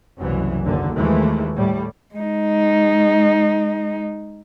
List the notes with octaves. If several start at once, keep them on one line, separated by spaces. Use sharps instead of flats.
F#1 C2 F#2 E3
F#1 D#2 D3
D#2 E3 F3 G#3 A3
A2 G3
G#3 D#4